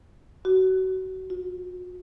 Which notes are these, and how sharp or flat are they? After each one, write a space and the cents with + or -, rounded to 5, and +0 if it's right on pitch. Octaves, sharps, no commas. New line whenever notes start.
F#4 +25
F#4 -40